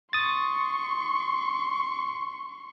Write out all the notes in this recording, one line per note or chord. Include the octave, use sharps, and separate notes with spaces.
C6 C#6 D#6 A6